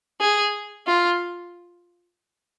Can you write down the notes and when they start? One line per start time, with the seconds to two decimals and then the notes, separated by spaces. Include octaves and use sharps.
0.21 G#4
0.87 F4